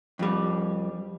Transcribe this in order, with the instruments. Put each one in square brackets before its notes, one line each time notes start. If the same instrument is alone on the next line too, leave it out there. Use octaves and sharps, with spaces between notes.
[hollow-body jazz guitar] F2 G3